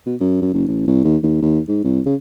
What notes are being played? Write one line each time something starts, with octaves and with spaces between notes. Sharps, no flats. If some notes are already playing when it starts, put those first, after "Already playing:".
B2
F#2
F#2
F#1
A1
C2
D#2
D#2
D#2
G#2
C2
C#3